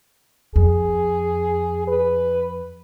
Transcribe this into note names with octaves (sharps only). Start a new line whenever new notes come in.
F2 G#4
B4